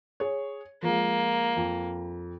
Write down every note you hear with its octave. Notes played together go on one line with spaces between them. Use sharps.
G#4 C#5
F3 G#3 A#3
F2